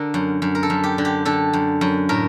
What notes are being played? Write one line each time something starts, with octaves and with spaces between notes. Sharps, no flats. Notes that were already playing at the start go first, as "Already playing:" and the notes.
Already playing: D3 A#4
F#2
F#2
A#4
A4
F#2
G4
D3
G4
D3 A4
F#2
F#2
A2 A#4